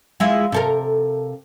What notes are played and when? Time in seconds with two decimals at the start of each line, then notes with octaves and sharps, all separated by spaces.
0.20 G#3 E4 F4
0.52 C3 A4 A#4